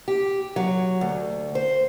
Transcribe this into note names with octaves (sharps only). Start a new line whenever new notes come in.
G4
F#3
D2
C5